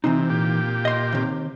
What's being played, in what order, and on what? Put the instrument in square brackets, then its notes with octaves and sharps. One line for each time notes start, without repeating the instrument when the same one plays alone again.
[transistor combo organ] C3 [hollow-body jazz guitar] E3 C4 D#4
[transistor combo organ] A#2 G4
[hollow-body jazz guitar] D#5 C6
D#2 C3